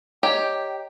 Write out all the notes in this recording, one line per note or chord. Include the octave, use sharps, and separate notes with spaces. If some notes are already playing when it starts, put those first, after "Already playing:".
G4 C#5 D#5 G5 A#5